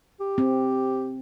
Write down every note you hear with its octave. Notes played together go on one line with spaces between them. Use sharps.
G4
C4